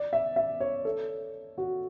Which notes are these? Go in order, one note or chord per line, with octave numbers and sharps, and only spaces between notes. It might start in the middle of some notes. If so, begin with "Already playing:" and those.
Already playing: D5
E5
E5
C#5
A4
F#4